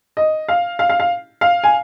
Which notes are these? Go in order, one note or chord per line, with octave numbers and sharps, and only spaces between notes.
D#5
F5
F5
F5
F5
F5
G#5